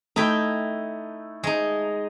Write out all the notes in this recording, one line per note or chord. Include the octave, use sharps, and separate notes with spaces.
A3 D#4 E4 G5
G#3 D#4